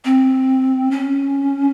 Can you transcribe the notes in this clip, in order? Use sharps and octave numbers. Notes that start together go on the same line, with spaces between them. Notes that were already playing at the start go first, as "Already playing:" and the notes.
C4
C#4